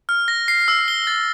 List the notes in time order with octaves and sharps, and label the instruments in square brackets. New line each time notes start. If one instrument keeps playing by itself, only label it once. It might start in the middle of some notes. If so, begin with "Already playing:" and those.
[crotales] F6
A#6
C7
E6
G7
A6